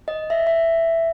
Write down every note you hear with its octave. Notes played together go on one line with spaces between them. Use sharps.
D#5
E5
E5